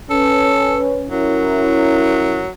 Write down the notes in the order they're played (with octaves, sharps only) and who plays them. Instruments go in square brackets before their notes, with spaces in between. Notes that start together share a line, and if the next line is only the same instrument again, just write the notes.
[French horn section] C#4 B4 [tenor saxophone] A4
[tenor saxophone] F#3 [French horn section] C#4 E4 A#4